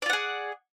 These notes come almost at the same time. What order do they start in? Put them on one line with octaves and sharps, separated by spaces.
D5 F4 F#5 G#4